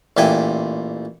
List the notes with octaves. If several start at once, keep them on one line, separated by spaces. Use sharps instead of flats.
A1 A#2 D4 E5 G5 G#5